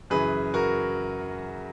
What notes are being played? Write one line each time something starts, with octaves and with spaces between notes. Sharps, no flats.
F#2 C#3 E3 G#4 B4
F#4 A#4